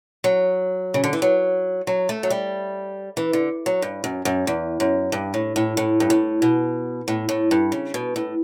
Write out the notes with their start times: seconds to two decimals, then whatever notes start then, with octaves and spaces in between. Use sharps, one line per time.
0.24 F#3
0.94 C#3
1.04 D3
1.13 E3
1.22 F#3
1.87 F#3
2.09 A3
2.23 F#3
2.30 G3
3.17 E3
3.33 D3
3.66 F#3
3.82 G2
4.04 F#2
4.25 F#2
4.47 E2
4.80 F#2
5.12 G2
5.34 A2
5.56 A2
5.77 A2
6.00 G2
6.10 A2
6.42 B2
7.08 A2
7.29 A2
7.51 G2
7.72 C#3
7.94 B2
8.16 A2